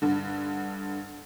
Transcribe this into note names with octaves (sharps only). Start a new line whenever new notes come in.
G2 D3